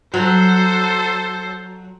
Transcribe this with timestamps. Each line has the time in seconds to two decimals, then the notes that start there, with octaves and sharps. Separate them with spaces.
0.14 F#3 A4 C5